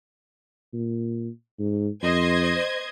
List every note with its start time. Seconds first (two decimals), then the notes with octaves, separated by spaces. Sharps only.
0.73 A#2
1.59 G#2
2.03 F2 C5 D#5 G#6